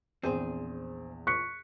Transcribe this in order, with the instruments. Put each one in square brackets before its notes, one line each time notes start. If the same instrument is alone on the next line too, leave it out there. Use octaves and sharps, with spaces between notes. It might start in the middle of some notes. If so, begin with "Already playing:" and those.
[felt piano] A#1 E2 [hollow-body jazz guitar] C4 G#4 C5
[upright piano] C#6 [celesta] F#6 B6 C#7